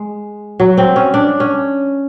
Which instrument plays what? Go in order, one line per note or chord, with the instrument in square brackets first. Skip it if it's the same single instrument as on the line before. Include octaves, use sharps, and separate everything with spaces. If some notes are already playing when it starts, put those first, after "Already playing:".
Already playing: [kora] G#3
F#3
C4
C#4
D4
C#4